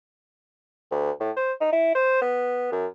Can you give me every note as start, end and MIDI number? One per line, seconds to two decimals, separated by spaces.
0.91 1.11 38
1.20 1.31 45
1.36 1.52 72
1.61 1.70 63
1.72 1.90 64
1.95 2.18 72
2.21 2.71 59
2.72 2.86 42